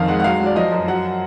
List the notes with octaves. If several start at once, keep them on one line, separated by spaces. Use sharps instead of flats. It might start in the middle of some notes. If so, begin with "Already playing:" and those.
Already playing: F2 D#3 F5
G#3 F#5
F#5
F#3 F5
F#3
D5
F3 D#5
F#2
F#3 F#5